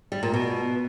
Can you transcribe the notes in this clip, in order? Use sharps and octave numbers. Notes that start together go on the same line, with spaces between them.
G3
A#2
B2